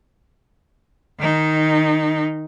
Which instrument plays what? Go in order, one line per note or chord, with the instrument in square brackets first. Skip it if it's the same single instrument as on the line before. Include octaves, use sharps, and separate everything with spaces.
[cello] D#3 D#4